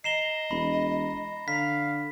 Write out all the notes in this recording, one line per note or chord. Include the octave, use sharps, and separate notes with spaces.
D#5 A#5 C7 E7 G7
E1 B5
D3 F5 B6